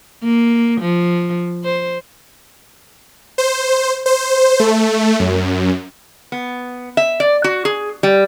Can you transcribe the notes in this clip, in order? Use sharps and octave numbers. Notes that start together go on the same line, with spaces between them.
A#3
F3
C5
C5
C5
A3
F#2
B3
E5
D5
F#4
G#4
G3